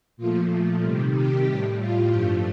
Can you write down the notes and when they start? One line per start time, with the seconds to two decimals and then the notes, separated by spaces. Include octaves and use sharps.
0.17 A#2 F3 A3 F4
0.81 C3 D#3 G3
1.13 G4
1.46 A2 G3 G4
1.78 F4
2.10 G2 F3 A3 G4